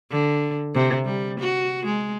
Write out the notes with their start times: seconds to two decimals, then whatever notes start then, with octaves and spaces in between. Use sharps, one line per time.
0.11 D3
0.75 C3
1.05 G3
1.40 F#4
1.86 G#3